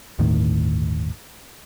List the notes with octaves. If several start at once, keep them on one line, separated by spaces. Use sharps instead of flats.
G1 D#2 A2 D#3